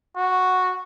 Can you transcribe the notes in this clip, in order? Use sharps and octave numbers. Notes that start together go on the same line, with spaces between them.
F#4